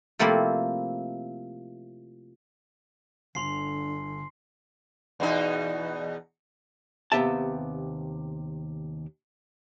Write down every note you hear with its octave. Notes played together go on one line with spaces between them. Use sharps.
C3 F3 A3 A#3 C4 E4
G1 D3 C6 C7 F7
E2 B2 D#4
D#2 C3 B3 G4 E5 A5